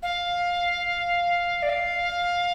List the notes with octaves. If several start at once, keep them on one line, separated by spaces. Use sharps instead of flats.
F5
D5
F5